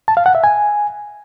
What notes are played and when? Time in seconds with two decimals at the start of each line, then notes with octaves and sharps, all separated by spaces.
0.08 A5
0.17 F5
0.26 F#5
0.35 E5
0.44 G#5